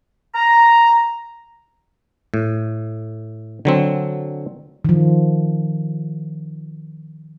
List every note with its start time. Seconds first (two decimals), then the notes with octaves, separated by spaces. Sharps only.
0.35 A#5
2.34 A2
3.65 D3 F#3 C4
4.85 D#3 F3